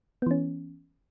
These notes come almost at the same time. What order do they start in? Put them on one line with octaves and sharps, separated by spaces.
B3 E3 C#4